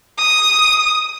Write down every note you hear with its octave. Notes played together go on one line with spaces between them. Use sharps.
D#6